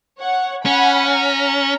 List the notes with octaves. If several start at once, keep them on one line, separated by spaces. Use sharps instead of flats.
C#5 F#5
C#4 F#5 G#5 B5
A#5